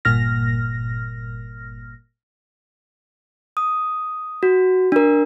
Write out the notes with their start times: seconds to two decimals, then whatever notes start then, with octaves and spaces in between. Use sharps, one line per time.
0.05 G1 A#2 F6 A#6
3.57 D#6
4.43 F#4
4.92 D4 A#4